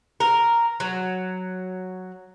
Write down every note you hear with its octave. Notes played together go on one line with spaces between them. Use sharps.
A#4
F#3